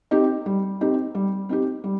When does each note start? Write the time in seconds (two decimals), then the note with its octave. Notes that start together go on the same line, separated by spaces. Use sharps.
0.11 C4 D#4 G4
0.46 G3
0.81 C4 D#4 G4
1.15 G3
1.49 C4 D#4 G4
1.84 G3